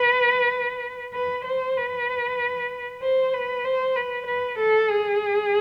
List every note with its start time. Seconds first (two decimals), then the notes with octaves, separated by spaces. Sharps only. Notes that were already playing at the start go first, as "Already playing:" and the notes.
Already playing: B4
1.14 B4
1.46 C5
1.77 B4
3.03 C5
3.34 B4
3.65 C5
3.96 B4
4.27 B4
4.59 A4
4.90 G#4